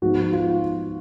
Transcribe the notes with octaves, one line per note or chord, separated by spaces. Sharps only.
G#2 F3 B3 D#4 F#4
F4